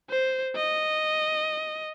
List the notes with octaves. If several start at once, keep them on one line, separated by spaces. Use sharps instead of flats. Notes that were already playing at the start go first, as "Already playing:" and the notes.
C5
D#5